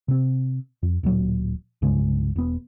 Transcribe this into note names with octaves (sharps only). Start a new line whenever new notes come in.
C3 C4
F2
D1 A#2 F#3
C2 G2 C#3 G#3
E1 B3